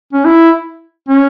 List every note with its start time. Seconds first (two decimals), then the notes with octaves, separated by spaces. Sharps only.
0.13 C#4
0.25 E4
1.09 C#4